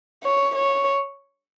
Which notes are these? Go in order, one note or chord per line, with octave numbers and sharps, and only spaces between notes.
C#5
C#5